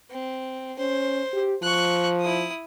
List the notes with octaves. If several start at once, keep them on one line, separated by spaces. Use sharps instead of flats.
C4
C#4 C5
G4
F3 C#6 F#6
E4 D#6